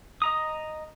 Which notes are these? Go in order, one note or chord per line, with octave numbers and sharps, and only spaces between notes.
D#5 A#5 D#6